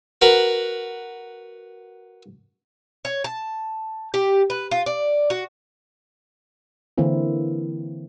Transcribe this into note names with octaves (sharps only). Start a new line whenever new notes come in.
F#4 A#4 B4
C#5
A5
G4
B4
F4
D5
F#4
D3 E3 A#3 C4 E4